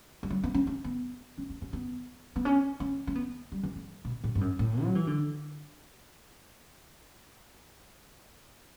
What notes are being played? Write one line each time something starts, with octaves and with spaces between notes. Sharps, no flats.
G3
F#3
B3
C#4
C#4
B3
C#4
D4
C#4
B3
B3
C#4
C#4
C#4
B3
G3
E3
D3
B2
A2
G2
F#2
A2
F#3
E3
D3